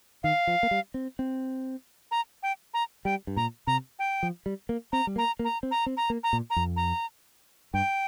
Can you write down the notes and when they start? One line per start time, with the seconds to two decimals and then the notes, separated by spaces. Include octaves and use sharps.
0.24 D#3 F5
0.47 F3
0.63 A#3
0.71 G3
0.94 C4
1.19 C4
2.11 A#5
2.43 G5
2.74 A#5
3.05 G3 G5
3.27 G2
3.37 A#2 A#5
3.67 C3 A#5
3.99 G5
4.23 F3
4.46 G3
4.69 A#3
4.92 C4 A#5
5.07 G3
5.16 A#3 A#5
5.39 A#3
5.45 A#5
5.63 C4
5.71 A#5
5.86 C4
5.97 A#5
6.10 A#3
6.23 A#5
6.33 A#2
6.50 A#5
6.56 F2
6.77 A#5
7.74 G2 G5